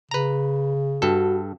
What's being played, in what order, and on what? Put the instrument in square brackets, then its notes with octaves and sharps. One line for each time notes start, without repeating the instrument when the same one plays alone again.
[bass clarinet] C#3 [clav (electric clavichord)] B4 A#5
[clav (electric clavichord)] G2 A4 [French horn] F#4